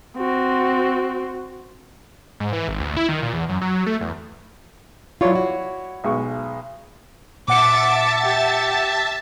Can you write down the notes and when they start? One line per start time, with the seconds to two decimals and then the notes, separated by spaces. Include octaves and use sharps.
0.17 C4 F#4
2.40 G#2
2.53 E3
2.68 G#1
2.80 D2
2.97 E4
3.09 D#3
3.22 A#2
3.34 E2
3.49 F#2
3.62 F#3
3.86 A3
4.01 E2
5.21 F#3 E4 F4 C#5 D5
5.35 F#4
6.04 B1 G#3 C#6
7.48 A#2 E5 F#5 A5 D6 A6 C#7
8.22 G4